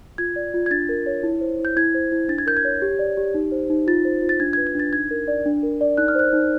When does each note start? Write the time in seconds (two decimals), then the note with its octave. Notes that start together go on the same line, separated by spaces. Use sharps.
0.18 F4 G#6
0.36 D5
0.54 F4
0.66 G#6
0.71 D4 A6
0.89 A#4
1.06 C#5
1.23 E4
1.41 C5
1.59 E4
1.65 G6
1.77 E4 G#6
1.94 C5
2.12 E4
2.29 D4 A6
2.38 G#6
2.46 A#4 G6
2.57 G#6
2.65 C#5
2.82 G4
2.99 D5
3.17 G4
3.34 D#4
3.52 C5
3.70 D#4
3.87 F4 A6
4.05 C5
4.22 F4
4.29 A6
4.40 D4 G#6
4.53 G#6
4.57 B4
4.67 G#6
4.75 D4 A6
4.93 D#4 G#6
5.11 A#4
5.28 D5
5.46 D4
5.63 A#4
5.81 D5
5.97 D#4 F#6
6.08 F6
6.15 C5 F#6
6.33 D#4